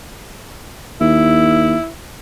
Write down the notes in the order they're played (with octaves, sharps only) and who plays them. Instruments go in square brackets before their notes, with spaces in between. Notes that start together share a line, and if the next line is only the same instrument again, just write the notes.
[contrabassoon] D#2 [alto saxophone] E4